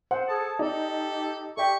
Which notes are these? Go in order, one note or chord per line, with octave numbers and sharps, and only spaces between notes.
C5 F#5
G#4 A4 A5 D#6
D#4 G4 A4 D5
G4 A4 D5 E5 G5 C#6